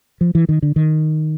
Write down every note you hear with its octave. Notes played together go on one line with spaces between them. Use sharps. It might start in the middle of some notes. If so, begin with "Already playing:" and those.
F3
E3
D#3
D3
D#3